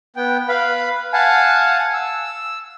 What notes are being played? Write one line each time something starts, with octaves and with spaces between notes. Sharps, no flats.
B3 G5
B4 F5 B5
F5 F#5 G#5 A5
E6